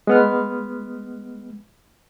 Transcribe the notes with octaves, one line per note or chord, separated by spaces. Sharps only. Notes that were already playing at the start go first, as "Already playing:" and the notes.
G#3 B3 F6